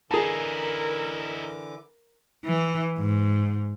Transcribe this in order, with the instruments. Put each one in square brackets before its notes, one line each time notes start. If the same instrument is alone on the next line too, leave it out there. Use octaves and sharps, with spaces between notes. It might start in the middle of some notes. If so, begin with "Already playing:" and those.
[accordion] D3 E3 D6 [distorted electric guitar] D#4 E4 [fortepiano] G#4 A5 [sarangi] A#4
[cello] E3
G#2